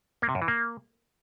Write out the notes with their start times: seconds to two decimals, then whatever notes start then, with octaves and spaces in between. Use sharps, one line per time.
0.22 A#3
0.29 C3
0.35 F#2
0.42 E3
0.48 A#3